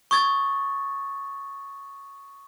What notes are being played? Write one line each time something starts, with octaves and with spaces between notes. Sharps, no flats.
C#6 D#6 G#6 A6